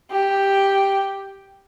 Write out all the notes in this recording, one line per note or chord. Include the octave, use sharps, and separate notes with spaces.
G4